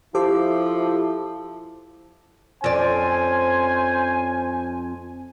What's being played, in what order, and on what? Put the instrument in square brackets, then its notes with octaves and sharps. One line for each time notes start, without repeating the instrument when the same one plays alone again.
[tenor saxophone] F3 [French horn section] E4 [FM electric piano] G4 C5 D6 [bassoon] A4
[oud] F2 D5 [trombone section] C#4 C5 [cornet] G#5